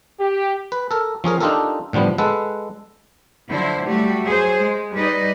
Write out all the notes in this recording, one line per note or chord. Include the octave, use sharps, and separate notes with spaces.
G4
B4
A4 A#4
F3 C#4 G#4 A#4
D4 D#4 F4 G4 A4 A#4
A2 D3 F3 G3 B3
G#3 A4 B4 F#5
D3 F3 F#3 E4 C5
F#3 G3 A3 F#4 G4
F#3 G#4 C5
G#3
G3 D#4 B4 D5 D#5